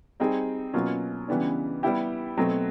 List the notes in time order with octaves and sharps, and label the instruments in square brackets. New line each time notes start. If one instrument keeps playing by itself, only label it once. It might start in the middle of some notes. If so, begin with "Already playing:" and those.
[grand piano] G3 C4 D#4 G#4
B2 F#3 A#3 C#4 F4
C#3 E3 G3 B3 D4
G3 B3 E4 G4
B2 F#3 A3 C4